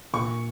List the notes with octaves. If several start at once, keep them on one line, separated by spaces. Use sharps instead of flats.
A#2 C#6